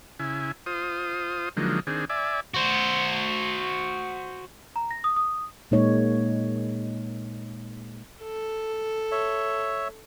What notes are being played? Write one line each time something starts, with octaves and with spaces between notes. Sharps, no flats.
C#3 E4 G#5
F4 C5 D#6
D3 F3 F#3 G#3 A#3 D#4
D#3 C4 D4 G#4
D5 E5 G#5
F#4 C5
A#5
A#6
D#6
D#6
A#2 G#3 A#3 D#4 C#5
A4
C#5 E5